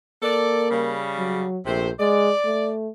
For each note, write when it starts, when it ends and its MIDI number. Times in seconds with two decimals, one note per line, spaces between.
0.23 0.97 58
0.23 0.66 69
0.23 0.66 74
0.71 1.45 49
0.71 1.45 55
1.18 1.59 54
1.66 1.91 34
1.66 1.90 48
1.66 1.90 57
1.66 1.90 72
2.00 2.31 56
2.00 2.68 74
2.45 2.89 57